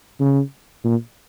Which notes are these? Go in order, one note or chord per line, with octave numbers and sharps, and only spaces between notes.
C#3
A#2